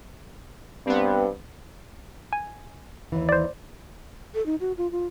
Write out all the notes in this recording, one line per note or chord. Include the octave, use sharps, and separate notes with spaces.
G2 B3 C4
G#5
D#2 E3
C5 D5
A4
D#4
F#4
F4
F4